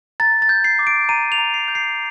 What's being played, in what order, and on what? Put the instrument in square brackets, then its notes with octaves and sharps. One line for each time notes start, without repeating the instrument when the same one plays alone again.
[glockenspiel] A#5 A6
A6
G6
C7
D6
D7
A#5 D#7
F7
A#5
C7
G6
C7